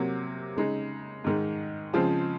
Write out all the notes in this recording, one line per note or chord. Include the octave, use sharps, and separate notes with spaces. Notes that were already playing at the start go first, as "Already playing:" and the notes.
Already playing: C3 F#3 A#3
C#3 G#3 D#4
G#2 D#3 G#3
C#3 F3 G#3 C4 F4